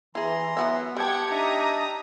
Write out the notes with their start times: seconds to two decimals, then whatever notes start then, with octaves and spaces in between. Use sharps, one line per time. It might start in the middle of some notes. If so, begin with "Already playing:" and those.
0.15 E3 E4 G#4 A#5 C6
0.57 F#3 B3 F#4 E5
0.97 G3 G4 F#5 G5 A5 G#6 C#7
1.31 D4 D#4 E5 A#5 D#6